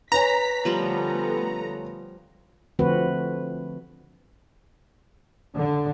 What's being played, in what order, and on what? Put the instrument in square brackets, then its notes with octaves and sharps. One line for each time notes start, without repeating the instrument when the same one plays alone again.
[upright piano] B4 C#5 G#5 [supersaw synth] A#5 [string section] B6
[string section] D3 A3 B3 [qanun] F3 G3 F4
[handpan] D3 F3 A3 C4 F#4 B4
[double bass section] D3